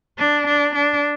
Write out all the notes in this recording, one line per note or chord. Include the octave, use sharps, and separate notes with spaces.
D4
D4
D4